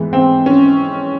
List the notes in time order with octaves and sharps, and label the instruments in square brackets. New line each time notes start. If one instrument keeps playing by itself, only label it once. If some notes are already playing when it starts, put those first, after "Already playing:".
Already playing: [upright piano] G#2 E3 G#3 B3
[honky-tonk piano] C4
C#4